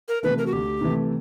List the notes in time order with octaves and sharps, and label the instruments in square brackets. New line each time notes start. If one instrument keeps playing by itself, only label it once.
[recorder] A#4
[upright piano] C3 E3 A3 [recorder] B4
[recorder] A#4
F#4
[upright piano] D2 [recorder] G4
[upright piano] C3 E3 A3